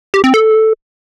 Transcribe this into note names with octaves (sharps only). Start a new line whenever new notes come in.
G4
C4
A4